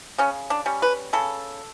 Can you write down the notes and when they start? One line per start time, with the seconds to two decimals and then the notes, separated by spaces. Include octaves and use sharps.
0.18 C#3 C#4
0.50 D4
0.66 G3 C#4
0.82 B4
1.13 C#3 A4